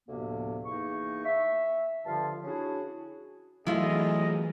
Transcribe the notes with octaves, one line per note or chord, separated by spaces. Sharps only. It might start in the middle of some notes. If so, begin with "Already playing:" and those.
D2 A2 C3 F3 A#3 B3
E2 A#3 D#4 C#6
E5
G2 D3 F3 F4 F5 A5
C#4 D4 E4 F#4 G#4
E3 F#3 A3 E4 F4 G#4 D#5